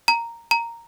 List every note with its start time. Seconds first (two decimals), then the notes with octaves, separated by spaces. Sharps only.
0.08 A#5
0.51 A#5